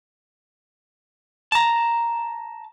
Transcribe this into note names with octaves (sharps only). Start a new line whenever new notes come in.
A5 A#5